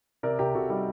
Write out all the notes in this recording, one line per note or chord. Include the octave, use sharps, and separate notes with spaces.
C3 A#4 D5
C3 G4 A#4
C3 F#4 A4
G3 D#4 G4